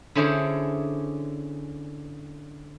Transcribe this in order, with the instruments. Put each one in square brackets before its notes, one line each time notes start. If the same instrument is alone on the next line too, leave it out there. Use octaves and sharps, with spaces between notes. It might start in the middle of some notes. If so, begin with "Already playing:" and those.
[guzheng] D3 C#4 E4 G#4 C5 D5